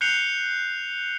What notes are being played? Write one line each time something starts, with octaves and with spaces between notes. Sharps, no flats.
F#6 G6 C7 C#7 F7 G7